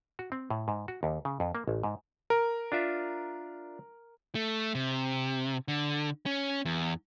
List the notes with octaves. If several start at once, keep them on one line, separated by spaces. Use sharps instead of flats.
F#4
C4
A2
G#2
F#4
D#2
C#3
F2
A#3
A1
G#2
A#4
D4 F4 E5
A3
C3
D3
C#4
E2